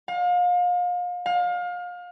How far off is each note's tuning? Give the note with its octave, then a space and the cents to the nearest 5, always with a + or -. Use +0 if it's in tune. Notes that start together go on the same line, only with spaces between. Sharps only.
F5 +35
F5 +30